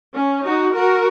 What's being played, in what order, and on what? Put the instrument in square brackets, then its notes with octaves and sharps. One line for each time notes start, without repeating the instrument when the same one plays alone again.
[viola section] C#4
D#4 F#4
F#4 A#4